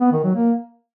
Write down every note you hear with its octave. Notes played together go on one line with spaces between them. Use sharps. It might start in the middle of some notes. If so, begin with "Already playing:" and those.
B3
D#3
F#3
A#3